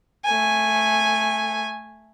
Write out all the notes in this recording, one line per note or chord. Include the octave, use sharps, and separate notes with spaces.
A3 G#5